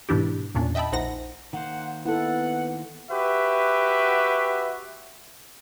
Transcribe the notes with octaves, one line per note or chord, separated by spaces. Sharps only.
G#2 B2 E3 D4 E4 G4
E2 A#2 C#4 D4
D#5 E5 G5 A5 B5
A#1 D#4 C5 F#5 A#6
D#3 A#3 C5 F#5
B3 E4 A4 F#5
F#4 G4 B4 E5